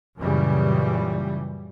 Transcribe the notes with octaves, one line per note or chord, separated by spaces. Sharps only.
F#2 A#2 C#3 E3 G3